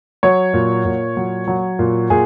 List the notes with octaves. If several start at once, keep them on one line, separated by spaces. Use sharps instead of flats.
F#3 C#5
A#2
A#2
F#3
F#3
A#2
A#2 G#4